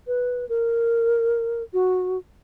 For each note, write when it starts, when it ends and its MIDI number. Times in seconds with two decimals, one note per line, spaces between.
0.07 0.47 71
0.49 1.63 70
1.73 2.18 66